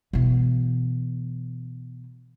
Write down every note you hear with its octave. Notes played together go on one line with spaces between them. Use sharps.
B2 E3